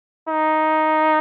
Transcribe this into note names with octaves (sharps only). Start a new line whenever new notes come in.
D#4